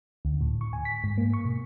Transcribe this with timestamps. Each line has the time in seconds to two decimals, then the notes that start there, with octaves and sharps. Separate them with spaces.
0.25 D2
0.41 A2
0.61 C#6
0.73 G#5
0.85 B6
1.04 G#2
1.18 A#3
1.34 C#6
1.45 B2